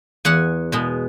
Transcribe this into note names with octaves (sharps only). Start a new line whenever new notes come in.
E2 F#5 G#5
B2 G#3 B3